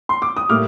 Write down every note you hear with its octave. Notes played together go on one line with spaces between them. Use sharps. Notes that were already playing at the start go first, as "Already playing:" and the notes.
C6
D6
D#6
A2 G3 A#3 D6 F6